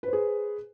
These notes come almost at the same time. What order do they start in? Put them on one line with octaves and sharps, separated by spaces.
B4 C5 G#4